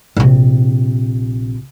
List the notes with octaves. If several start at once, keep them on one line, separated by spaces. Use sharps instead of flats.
A#1 C3